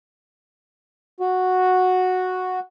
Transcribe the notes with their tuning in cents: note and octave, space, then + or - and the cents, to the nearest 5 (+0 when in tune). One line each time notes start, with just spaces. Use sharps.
F#4 -5